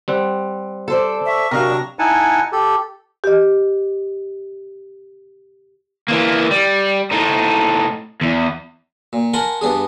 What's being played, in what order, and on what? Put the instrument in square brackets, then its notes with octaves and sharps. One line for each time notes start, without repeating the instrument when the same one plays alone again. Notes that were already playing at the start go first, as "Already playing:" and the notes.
[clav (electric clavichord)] G3 C4 F#5
[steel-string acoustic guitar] A4 C5 D5
[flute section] E5 C#6
[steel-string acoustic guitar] C3 F#3 [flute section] D4 A#5 C#6 [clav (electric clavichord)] A#4 D#5 F5
[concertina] D#4 E4 F#5 G#5 A5
G4 A4
[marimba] G4 D#5
[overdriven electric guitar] E3 A#3
G3
A2 D#4
E2
[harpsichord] A#2
A#4 F#5 G#5 A5 B5 C6
G2 B3 D4 G#4